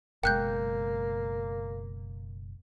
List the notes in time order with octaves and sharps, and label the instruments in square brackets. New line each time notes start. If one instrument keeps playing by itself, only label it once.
[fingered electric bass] F#1 B2 G#3 [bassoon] A#3 [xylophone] G5 F#6 G6